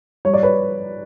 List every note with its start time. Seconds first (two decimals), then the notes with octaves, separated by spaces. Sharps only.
0.25 G3 C#5
0.34 D5
0.43 B4 C#5